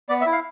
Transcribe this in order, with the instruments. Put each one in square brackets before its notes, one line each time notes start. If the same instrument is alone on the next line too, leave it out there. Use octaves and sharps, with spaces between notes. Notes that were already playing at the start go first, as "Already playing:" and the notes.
[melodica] B3 D5
E5
E4
F5